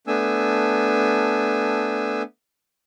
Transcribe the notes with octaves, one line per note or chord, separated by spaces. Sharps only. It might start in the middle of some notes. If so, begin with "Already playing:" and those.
A3 B3 D4 G#5 E6